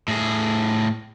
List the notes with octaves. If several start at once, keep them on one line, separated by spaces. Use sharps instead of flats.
A2 G#4